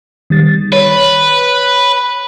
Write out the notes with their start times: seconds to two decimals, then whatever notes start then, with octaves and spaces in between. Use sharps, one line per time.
0.30 D#3 G3 A6
0.73 B4 C#5